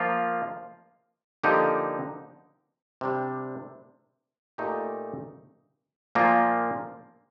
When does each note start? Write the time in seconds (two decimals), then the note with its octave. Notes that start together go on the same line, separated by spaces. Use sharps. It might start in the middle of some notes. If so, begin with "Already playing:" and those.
Already playing: F3 A#3 F4
1.43 D3 F3 A#3 D#4 G4
3.01 C3 G3 D4
4.58 A#2 A3 D#4 G4
6.15 A#2 F3 A#3 F4